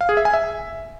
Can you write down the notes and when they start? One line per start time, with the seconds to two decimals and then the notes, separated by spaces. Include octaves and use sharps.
0.01 F5
0.09 G#4
0.17 E5
0.25 G#5
0.34 E5